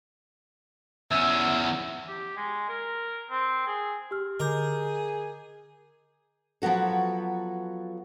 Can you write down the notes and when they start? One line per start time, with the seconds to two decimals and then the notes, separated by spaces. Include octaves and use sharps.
1.11 E2 C#4 E5
2.08 G4
2.37 G#3
2.69 A#4
3.30 C4
3.67 G#4
4.11 G4 E6 F6
4.40 D3 G#4 A#4 D#5 A#5 D6 G6
6.62 F3 F#3 B3 F#4 A4